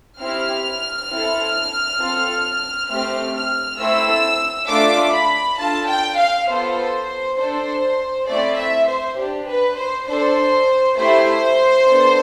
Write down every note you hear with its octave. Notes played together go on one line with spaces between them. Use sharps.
C4 E4 G4 F6
C4 E4 A4
C4 F4 A4
A3 C4 G4 F6
F6
A3 C4 E4 A4 E6
A3 D4 F4 A4 D6
B5
D4 F4 A4 A5
G5
F5
B3 F4 A4 C5
D4 A4 C5
A3 C4 E4 D5
E5
C5
D4 G4
B4
C5
D4 A4 C5
A3 E4 G4 C5
B3 D4 A4